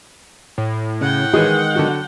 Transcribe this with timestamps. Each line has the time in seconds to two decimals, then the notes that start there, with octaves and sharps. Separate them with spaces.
0.58 A2
1.01 C#3 F#5 G5
1.34 D#3 E3 G#3 G#4
1.75 D3 F#3 F#4